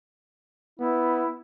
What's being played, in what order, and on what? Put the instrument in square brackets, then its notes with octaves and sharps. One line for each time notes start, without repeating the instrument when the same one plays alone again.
[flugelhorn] B3 [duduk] E4